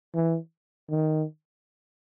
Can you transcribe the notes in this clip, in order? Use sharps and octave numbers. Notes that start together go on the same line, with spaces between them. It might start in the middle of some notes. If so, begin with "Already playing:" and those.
E3
D#3